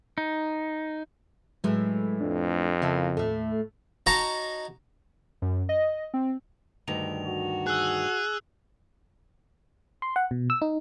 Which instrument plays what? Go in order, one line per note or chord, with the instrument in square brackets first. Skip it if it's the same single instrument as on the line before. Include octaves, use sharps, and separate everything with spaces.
[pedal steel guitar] D#4
[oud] A2 E3 [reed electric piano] F#3 G#3
[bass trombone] F2 [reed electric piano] D4
[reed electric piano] C#3 [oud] A#3 E4 A4
[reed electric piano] D#2 A4 [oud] A2 A3
[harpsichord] D#4 F#4 C#5 D#5 A5 A#5
[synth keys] F#2
D#5
C4
[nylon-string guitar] D2 G2 D#3 [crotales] F7
[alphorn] F#4
[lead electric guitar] G#4 [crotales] E6 F#6
[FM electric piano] C6
F#5
B2
E6
D#4